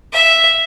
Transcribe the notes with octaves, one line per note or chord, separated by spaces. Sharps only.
E5